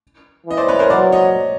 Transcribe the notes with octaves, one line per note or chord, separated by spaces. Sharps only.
E3 D#5
C5 D5
B4 C#5
A#4 C5
F#3 C5 D5
C#5 D#5